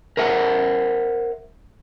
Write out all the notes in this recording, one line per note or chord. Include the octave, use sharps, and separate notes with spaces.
A#4 C5 E5 F#5